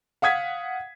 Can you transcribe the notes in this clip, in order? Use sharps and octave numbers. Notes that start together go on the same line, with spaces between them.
F5 F#5 D#6 G#6 B6